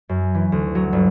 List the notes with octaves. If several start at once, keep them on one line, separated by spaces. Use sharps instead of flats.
F#2
E3
D2
F#3
G1